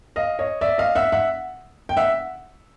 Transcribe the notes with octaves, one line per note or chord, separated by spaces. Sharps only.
D#5 F5
C#5 D#5
D5 E5
D#5 F5
E5 F#5
E5 F#5
G5
E5 F#5